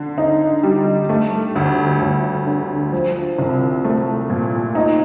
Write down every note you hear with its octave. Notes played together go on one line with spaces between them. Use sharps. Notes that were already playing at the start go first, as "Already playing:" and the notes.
Already playing: D3
D#4
G3
A3
D2
D2
D3
F3
C2
A3
A#2
D#4